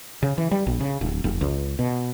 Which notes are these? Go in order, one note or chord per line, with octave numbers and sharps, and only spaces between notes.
C#3
E3
G3
A#1
C#3
D1
F1
C#2
B2